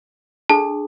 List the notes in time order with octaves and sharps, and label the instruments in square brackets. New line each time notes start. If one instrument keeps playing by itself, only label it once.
[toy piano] D4 G#4 A4 [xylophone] A5